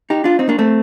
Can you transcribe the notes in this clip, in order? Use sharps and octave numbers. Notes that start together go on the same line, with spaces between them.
D#4 G4
D4 F4
C4 D#4
A#3 D4
A3 C4